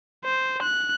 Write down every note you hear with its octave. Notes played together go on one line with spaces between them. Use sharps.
C5
F#6